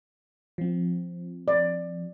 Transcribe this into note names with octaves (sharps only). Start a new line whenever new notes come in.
F3 C4
D5